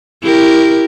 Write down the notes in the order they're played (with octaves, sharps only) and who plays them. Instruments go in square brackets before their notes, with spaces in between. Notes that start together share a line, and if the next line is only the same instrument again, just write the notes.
[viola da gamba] E4 G4 A#4